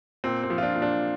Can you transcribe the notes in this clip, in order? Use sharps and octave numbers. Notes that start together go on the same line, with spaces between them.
A#2 C4
C4
F3
F4
D4
A#2
D4